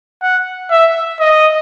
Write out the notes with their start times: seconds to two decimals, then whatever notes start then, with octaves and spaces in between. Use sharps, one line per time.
0.22 F#5
0.71 E5
1.20 D#5